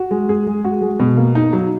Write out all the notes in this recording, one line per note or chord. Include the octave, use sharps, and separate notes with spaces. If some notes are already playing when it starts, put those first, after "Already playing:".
Already playing: F#4
G#3
G#4
G#3
F#4
G#3
B2
A#3
D#4
F#3